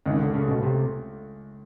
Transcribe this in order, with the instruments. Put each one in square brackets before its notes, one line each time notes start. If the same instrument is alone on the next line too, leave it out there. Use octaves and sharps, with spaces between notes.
[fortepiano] C#2 [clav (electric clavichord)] D#3
[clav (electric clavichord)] D3
[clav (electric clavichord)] C#3 [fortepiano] A3
[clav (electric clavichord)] B2
[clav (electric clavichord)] C3 [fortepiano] A3